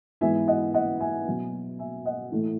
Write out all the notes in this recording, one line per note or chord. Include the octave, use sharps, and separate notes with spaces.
G#2 E3 B3 E5 G#5
D#5 F#5
D#5 F#5
E5 G#5
B2 F#3 B3
E5 G#5
D#5 F#5
A2 E3 A3